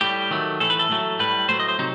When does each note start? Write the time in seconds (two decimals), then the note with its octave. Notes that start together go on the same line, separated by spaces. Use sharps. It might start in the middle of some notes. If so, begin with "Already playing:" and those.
0.01 A2 G3 G4
0.31 D#3 F#3 A3
0.60 A2 E3 A3 A4
0.70 B4
0.79 A4
0.90 A2 F#3 A3
1.19 A2 G3 B4
1.49 A2 F#3 A3 C5
1.60 D#5
1.69 C5
1.79 C3 F#3 D#4